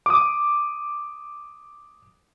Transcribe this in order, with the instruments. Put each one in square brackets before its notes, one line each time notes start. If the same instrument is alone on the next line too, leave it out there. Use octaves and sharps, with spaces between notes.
[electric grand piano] D6 D#6